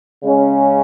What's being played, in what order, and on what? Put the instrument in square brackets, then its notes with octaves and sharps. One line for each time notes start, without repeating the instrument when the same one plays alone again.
[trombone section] C#3 G#3 C#4